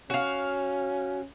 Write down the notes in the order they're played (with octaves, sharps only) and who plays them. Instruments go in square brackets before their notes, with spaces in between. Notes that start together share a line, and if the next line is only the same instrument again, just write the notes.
[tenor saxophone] C#4 [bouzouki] F#4 F5